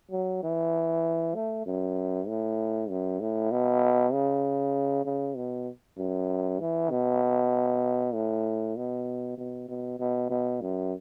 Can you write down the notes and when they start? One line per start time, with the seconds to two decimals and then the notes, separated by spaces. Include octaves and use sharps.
0.11 F#3
0.43 E3
1.35 A3
1.66 F#2
2.28 A2
2.90 F#2
3.20 A2
3.51 B2
4.13 C#3
5.05 C#3
5.36 B2
5.98 F#2
6.60 E3
6.91 B2
8.14 A2
8.76 B2
9.38 B2
9.68 B2
10.00 B2
10.30 B2
10.61 F#2